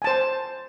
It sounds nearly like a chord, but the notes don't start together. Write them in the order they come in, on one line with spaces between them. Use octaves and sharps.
G#5 A5 C5